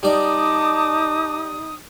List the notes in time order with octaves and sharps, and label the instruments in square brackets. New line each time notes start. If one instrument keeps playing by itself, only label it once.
[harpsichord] G3 D5 [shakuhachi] D#4 [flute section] A5 D6 [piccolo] D#6